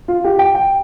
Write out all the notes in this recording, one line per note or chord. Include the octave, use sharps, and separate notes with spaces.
F4
G4
G5
G5